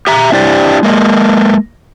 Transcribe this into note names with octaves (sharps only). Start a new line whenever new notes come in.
G4 E5 A#5
C4 D4 E4 G4 C5 D5
G#3 A#3 D#5